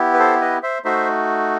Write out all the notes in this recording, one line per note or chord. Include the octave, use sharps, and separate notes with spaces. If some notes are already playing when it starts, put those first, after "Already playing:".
Already playing: B3 E4 G4
B4
A4 C5
B4 D#5
C5 E5
A3 D#4 F#4 C5 E5